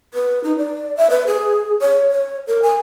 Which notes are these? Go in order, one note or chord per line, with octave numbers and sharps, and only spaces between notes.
B4
D#4
D5
E5
B4
G#4
C#5
C#5
A#4
G#5